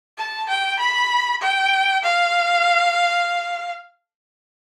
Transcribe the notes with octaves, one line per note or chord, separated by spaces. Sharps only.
A5
G5
B5
G5
F5